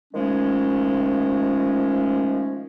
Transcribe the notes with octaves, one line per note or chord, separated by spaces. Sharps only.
D#3 F3 G#3 A3 C#4